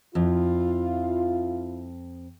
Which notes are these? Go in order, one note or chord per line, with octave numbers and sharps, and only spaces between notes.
F2 E4 F4